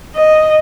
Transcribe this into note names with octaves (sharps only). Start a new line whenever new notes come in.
D#5